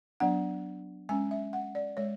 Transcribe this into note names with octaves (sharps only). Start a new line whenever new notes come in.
F#3 B3 D4 F#5
G#3 C#4 G#5
E5
F#5
D5
G#3 C#5